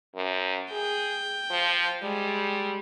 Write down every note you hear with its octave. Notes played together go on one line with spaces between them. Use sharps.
F#2
G#4 G5
F3
G3 G#3